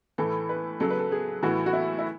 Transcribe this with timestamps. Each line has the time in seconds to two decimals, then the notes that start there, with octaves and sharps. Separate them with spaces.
0.18 A2 E3 A4
0.49 B4
0.80 C#3 F#3 A4
0.90 B4
0.99 A4
1.12 G#4
1.43 A2 E3 F#4
1.66 F#4
1.73 E4
1.98 E4